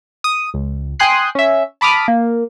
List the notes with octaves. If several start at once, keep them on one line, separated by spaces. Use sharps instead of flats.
D#6
C#2
G5 G#5 C6 D#6 F#6 C7
C#4 E5
A5 B5 D6 D#6 F6
A#3